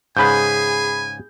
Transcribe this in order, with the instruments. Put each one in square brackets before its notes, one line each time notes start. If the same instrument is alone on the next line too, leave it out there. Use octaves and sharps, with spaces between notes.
[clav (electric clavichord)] G#2 C#3 B4 [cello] G#4 [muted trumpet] G#5 [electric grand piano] B5 G6